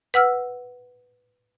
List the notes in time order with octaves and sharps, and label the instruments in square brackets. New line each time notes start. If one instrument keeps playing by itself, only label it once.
[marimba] B4 F#5 E6 F6